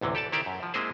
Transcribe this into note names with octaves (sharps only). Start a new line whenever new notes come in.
A1 D2 C3 E3
G4 A4 D5 A5
D#3 E4 G4 A#4 C5 D5
F#2
F3
G#3 A#3 C4 E4 G#4 C5